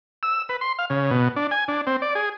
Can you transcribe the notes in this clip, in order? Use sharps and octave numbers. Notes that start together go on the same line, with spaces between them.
E6
B4
C6
F5
C#3
B2
D4
G#5
D4
C4
D5
G#4